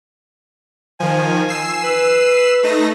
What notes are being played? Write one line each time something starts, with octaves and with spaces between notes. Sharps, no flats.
D#3 F3 G#5
E6 C7 E7
B4
A3 D#4 A#6